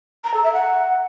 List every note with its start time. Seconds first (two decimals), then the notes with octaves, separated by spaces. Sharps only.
0.24 A#5
0.33 A4
0.43 E5
0.53 F#5